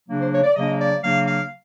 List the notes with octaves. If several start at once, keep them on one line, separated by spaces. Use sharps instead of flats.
C#3 F#3 A#3 D4
C5
C#5
D5
C#3 F#3 A#3 D4 D#5
D5
C#3 F#3 A#3 D4 F5
F5